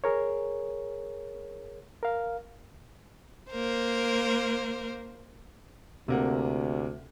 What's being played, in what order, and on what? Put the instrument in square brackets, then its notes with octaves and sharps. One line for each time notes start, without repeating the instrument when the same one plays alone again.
[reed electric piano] G#4 A#4 C#5
A#4 F5
[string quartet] A#3 A#4 C5
[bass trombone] D2 [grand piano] C3 A#3 F#5